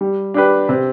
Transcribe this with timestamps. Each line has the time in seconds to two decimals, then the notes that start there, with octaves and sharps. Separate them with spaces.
0.01 G3
0.34 D4 G4 B4
0.69 C3